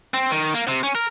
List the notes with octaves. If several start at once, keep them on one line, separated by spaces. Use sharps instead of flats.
C4
D#3
A#3
C3
C#4
A#4